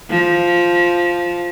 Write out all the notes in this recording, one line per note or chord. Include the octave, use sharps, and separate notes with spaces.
F3